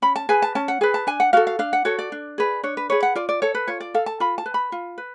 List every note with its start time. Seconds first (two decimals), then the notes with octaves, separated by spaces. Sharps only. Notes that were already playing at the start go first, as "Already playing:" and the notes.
0.02 C#4 B5
0.16 A5
0.29 G#4 B4 G#5
0.42 A5
0.55 C#4 A5
0.68 F#5
0.81 G#4 B4 G#5
0.94 A5
1.07 D4 G#5
1.20 F#5
1.33 F#4 A4 F5
1.47 F5
1.59 D4 F5
1.73 F#5
1.85 F#4 A4 C#5
1.99 D5
2.12 D4
2.38 G#4 B4
2.63 D4 C#5
2.77 B4
2.90 G#4 B4 C#5
3.03 F#5
3.15 F4 D5
3.29 D5
3.42 A4 C#5
3.55 B4
3.67 F4 C#5
3.80 D5
3.94 A4 F5
4.06 A5
4.20 F4 B5
4.38 A5
4.46 B4
4.54 B5
4.72 F4
4.98 B4